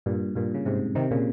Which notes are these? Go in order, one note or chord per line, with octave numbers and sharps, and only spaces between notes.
G2 A#2
G2 A#2
C#3
G#2 C3
C3 D#3
A#2 C#3